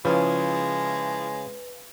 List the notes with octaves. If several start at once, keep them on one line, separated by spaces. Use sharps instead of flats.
C#3 F3 G#3 C#4 E4 B4 F5